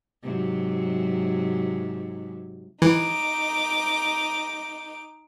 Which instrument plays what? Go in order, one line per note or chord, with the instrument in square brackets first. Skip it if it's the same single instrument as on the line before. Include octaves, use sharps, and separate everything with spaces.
[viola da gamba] G#2 C3 F#3
[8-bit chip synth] E3 [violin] D#4 D6